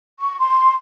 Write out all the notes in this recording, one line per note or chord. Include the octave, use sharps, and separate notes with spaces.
C#6
C6